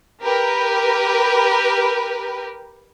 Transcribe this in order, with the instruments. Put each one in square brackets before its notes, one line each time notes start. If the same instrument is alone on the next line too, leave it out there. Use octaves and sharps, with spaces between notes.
[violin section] G4 A#4 B4